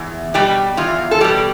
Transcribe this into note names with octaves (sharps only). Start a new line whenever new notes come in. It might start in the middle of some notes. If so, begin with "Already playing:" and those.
Already playing: E2
B2 G3 G4
E2 F4
A4
B2 G3 G4